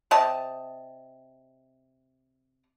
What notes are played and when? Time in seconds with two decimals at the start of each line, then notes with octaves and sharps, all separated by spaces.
0.11 C3 G4 D#5 A5